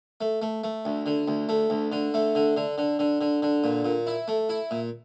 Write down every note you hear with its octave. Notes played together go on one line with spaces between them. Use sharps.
A3
A3
A3
D2
D3
D2
A3
D2
D3
A3
D3
D3
D3
D3
D3
D3
A#2
A#2
E4
A3
E4
A#2